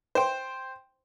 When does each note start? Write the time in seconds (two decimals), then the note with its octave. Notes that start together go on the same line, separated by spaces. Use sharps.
0.15 C5 G5